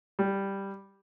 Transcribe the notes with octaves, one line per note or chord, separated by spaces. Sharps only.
G3